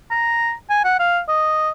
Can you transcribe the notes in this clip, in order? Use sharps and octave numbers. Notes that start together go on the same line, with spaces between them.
A#5
G#5
F#5
F5
D#5